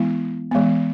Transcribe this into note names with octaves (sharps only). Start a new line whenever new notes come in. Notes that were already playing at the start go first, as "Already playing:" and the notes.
Already playing: E3 G#3 B3 E4
E3 G#3 B3